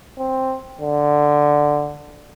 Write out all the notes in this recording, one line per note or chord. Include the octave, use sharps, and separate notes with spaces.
C4
D3